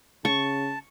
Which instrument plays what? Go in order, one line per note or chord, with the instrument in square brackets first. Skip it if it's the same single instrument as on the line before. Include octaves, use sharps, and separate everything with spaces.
[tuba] C#3 [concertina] A5 [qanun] C#6